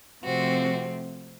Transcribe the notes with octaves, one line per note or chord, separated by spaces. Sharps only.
C3 F3 A3 C4 F#4